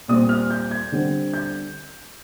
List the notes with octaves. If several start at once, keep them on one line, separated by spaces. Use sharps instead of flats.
A#2 G3 C4 D#6
F6
G6
G#6
D3 G3 C4
G6